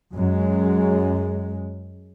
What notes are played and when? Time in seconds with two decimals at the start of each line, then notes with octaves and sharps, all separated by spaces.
0.12 F#2 G#3